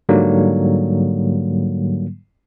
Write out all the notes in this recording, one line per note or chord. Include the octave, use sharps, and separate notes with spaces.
G#2 D3 F#3 G3 A#3